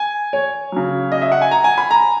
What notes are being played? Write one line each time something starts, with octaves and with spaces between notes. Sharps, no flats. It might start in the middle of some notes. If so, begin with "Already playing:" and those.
Already playing: G#5
C#5
C#3 F#3
D#5
E5
F#5
G#5
A#5
G#5
B5
A#5